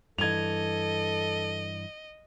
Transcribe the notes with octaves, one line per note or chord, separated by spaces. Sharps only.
G2 E3 A4 D#5 G#6 F7